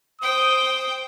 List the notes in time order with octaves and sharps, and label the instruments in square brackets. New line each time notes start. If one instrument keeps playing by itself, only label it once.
[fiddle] C5 G5 [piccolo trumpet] D#6